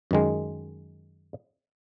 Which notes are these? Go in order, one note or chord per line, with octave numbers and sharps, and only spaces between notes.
F#2 D#3 G#3